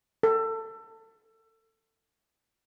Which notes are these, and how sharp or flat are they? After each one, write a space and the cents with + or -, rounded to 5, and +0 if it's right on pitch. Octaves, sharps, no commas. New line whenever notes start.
A4 +25